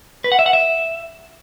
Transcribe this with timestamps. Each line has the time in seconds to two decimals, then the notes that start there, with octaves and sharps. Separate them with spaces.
0.24 B4
0.32 F#5
0.39 E5
0.46 F#5
0.53 E5